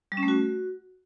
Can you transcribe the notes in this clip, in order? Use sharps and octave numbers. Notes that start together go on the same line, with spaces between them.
G3
C#4
A3
F#4